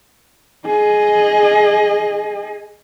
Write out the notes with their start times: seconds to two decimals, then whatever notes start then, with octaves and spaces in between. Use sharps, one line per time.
0.66 G#4 D#5